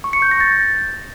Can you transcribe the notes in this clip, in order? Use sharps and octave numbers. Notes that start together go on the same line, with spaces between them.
C#6
C#7
G6
A#6
A6